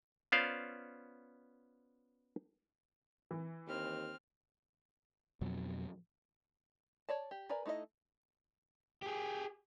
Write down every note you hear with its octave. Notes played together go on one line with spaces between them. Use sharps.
B3 C#4 F4 C5 D5 F5
E3
D#2 C4 F6
F2 B2 F#3
C#5 D5 A5
G4
A#4 B4 D5 G#5 A#5
A3 D#4 E4 A4 D#5
G4 G#4